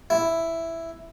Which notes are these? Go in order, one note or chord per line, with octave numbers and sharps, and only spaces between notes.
E4